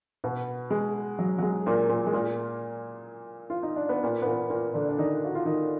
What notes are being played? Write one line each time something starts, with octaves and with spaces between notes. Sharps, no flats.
B2 B3
G#3
F#3
F#3
G#3
A#2 A#3
A#2 A#3
G#3
A#2 A#3
F4
D#4
D4
B3
A#2 A#3
B3
A#2 A#3
A#2 A#3
D3 D4
D4
D#3 D#4
F#4
F4
D#3 D#4